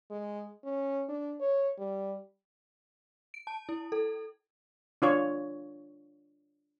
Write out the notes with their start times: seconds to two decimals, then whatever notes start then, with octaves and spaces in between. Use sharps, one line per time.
0.11 G#3
0.64 C#4
1.09 D4
1.40 C#5
1.78 G3
3.34 D7
3.47 A5
3.69 E4
3.92 A4
5.02 D4 F4 C#5